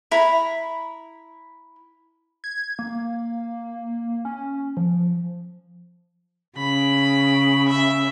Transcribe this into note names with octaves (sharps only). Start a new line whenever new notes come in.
E4 A#5 B5
G#6
A#3
C#4
F3
C#3 B5
E5